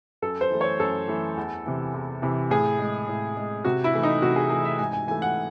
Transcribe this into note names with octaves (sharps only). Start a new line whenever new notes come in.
F#2 A4
C5
E3 A3
C#5
F#2 A4
E3 A3
E2
C3 E3
E2
C3 E3
A2 G#4
G#3
A2
G#3
C3 F#4
E4
E3 A3
D#4
C3 F#4
G#4
E3 A3 G#4
E5
G#2 G#5
G#5
E3 A3 G#5
F#5